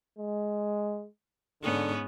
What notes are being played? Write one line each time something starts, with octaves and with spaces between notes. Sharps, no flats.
G#3
G#2 D3 B3 C#4